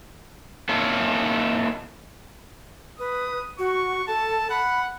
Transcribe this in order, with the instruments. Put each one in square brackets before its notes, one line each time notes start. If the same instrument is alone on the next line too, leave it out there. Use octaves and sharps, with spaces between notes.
[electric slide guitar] A#3 C#4 D#4 E4 A4
[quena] B4 [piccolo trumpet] D#6
[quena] F#4 [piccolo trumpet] C#6
[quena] A4 [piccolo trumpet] A5
[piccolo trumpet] F#5 [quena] B5